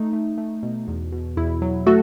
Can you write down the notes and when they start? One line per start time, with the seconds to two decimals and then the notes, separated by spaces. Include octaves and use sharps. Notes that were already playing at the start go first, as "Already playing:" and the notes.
Already playing: A3 D#4
0.13 A3
0.38 A3
0.63 B2
0.88 E2
1.12 B2
1.37 E2 E4
1.62 F#3
1.86 A3 F#4 A4